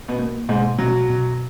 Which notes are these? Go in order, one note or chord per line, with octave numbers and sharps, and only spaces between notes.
B2 B3
A#3
G#2 B2 G#3
B2 F#3 F#4
B2